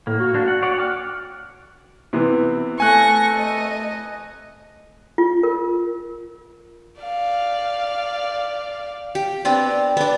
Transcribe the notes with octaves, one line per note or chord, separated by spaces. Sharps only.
A2 A#3
F#4
A#3 D4
F#5
C#5 D5 F#5
G5 D6 F6
C3 E3 B3
A3 G#5 C#6 F#6 A#6
D#5
F4
A#4
D5 F5
G4
B3 C4 D4
B3 D4